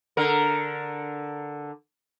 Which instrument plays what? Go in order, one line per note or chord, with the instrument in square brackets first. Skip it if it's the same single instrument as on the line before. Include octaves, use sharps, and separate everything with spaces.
[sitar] D3 A#4